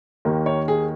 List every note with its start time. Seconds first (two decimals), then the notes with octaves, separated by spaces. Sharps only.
0.25 D#2 D#3 A#3
0.46 C#5
0.68 G#4